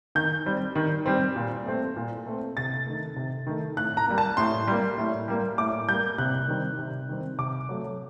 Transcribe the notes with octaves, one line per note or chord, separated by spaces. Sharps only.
D#3 G6
G3 C4
D#3
G3 C4
A#2
A3 C4
A#2
A3 C4
C3 A6
D#3 A3
C3
D#3 A3
A2 F#6
A#5
G3 A#3
A5
A2 C6
G3 A#3
A2
G3 A#3
A2 D6
G3 A#3 G6
C3 F#6
D#3 G3 C4
C3
D#3 G3 C4
C3 D6
F#3 A3